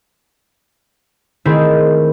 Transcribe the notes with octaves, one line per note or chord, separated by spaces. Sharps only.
D#3 A3 C4 E4 G#4 C5